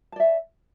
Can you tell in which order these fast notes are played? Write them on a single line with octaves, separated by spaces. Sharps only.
A5 D5 E5